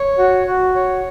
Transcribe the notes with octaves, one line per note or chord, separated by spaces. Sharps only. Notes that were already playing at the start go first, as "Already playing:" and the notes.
Already playing: C#5
F#4
F#4
C#5